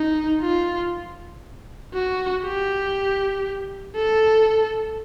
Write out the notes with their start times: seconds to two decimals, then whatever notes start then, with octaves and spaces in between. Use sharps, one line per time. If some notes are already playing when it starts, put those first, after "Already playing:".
Already playing: D#4
0.42 F4
1.94 F#4
2.44 G4
3.96 A4